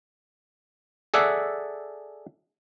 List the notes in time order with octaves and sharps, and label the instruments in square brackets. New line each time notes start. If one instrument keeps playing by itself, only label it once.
[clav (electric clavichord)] G#4 A4 D5 E5 F#5